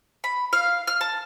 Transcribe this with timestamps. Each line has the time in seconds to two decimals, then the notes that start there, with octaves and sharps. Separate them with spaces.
0.24 B5
0.53 F5
0.87 F6
1.01 A5